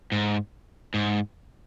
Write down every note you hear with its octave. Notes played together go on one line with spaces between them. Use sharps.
G#2
G#2